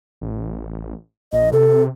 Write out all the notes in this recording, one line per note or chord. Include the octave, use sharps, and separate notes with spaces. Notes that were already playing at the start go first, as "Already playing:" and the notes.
A1
A#1 D#5
C3 A4